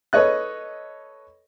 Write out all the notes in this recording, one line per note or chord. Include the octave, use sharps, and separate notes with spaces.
A4 B4 C#5 D#5 F#6